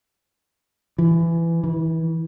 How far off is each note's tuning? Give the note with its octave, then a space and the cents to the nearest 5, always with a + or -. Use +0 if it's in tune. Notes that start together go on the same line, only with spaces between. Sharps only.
E3 +20
E3 -30